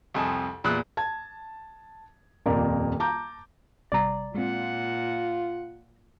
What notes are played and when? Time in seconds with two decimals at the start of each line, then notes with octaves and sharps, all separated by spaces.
0.14 C2 F2 G#5 A5 D#6
0.64 E2 A#2 B5 E6 F#6
0.97 A5 G#6
2.46 D#1 F2 A#3 A#4 D5
3.00 A5 A#5 D6 G6
3.92 G#1 C3 G3 D5 A#5
4.35 A#2 G#3 C4 F4 F#5